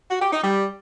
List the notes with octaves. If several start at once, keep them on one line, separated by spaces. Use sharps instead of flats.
F#4
G4
D#4
G3